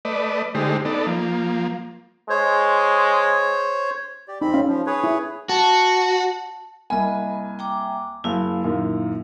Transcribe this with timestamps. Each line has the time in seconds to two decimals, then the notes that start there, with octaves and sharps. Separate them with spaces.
0.05 A3 B4 D5 D#5
0.55 D3 G#3 A3 D#4 G4 C5
0.85 B3 D#4 A4 D5
1.07 F3 A#3
2.30 G#3 C5 C#5
4.28 G4 D5
4.41 F2 C4 D#4 B5
4.54 C#4 F5
4.68 F3
4.86 G#4 B4 C#5
5.04 E4
5.49 F#4 A5
6.90 C2 A#3 D#5 G#5 B5
7.59 G5 A#5 D6
8.24 F#1 E4 F5
8.64 F#2 A#2 D#3